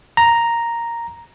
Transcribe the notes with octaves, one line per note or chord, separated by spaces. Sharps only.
A#5